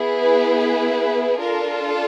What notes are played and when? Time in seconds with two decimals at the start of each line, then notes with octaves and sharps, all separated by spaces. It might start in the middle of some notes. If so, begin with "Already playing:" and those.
Already playing: B3 E4 G#4
0.19 B4
0.59 B4
1.38 D4 F4 A4 A#4